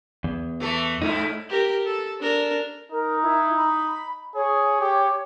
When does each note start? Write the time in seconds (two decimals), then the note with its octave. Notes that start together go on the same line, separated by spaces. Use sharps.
0.24 E2
0.60 E3 A3 A4
1.02 G#2 A3 D#4 E4
1.49 G4 A#4
1.86 A4
2.20 D4 A#4
2.92 D#4 A#4
3.23 E4
3.57 B5
4.35 G#4 C#5
4.81 G4